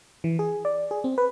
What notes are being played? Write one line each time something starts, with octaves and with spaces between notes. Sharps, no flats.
E3
G#4
D5
G#4
C4
B4